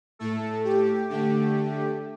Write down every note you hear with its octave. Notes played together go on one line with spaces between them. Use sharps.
A2 A3 A4
G4
D3 A3 G4